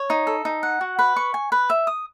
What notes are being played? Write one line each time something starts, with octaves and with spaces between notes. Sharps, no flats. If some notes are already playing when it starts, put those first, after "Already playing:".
Already playing: C#5
D#4
A4
D#4
F#5
F#4
B4
C#6
G#5
B4
E5
D#6